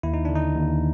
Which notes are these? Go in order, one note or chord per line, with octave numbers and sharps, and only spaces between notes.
D#2 E4
D#4
D3 D4
D#4
D#2